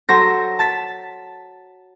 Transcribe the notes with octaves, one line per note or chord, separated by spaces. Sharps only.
F#3 A4 C5 A#6
A5 A6 B6